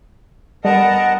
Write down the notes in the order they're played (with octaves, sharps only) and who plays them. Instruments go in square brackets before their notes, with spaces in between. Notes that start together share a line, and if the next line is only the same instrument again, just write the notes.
[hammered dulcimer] D3 B3 [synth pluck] G3 [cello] A#4 [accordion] D#5 F#5 A5